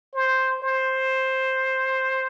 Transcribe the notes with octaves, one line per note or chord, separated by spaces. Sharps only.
C5
C5